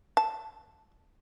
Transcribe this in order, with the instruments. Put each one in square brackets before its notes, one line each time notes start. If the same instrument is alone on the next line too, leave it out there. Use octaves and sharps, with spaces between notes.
[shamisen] A5